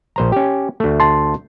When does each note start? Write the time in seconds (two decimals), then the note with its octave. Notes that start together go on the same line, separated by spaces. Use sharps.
0.16 A#1 C5 A#5
0.32 C#4 G4
0.80 D2 A3
1.00 A5 C6